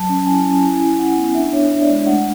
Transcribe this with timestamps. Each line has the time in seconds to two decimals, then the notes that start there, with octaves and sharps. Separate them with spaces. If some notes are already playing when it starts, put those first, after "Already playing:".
Already playing: F#3 A5
0.09 C#4
0.26 E4 G#5
0.45 C#4
0.63 E4 G#5
0.81 E4
0.99 E4 F#5
1.17 B3
1.35 D4 E5
1.53 D4 C#5
1.70 D4 E5
1.82 D5
1.89 G#3 E5
2.06 A3 F#5